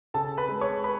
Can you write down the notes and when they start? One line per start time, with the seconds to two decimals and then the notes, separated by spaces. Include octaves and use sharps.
0.14 C#3 A4 A5
0.38 B4 B5
0.49 G#3
0.61 C#5 C#6
0.84 B4 B5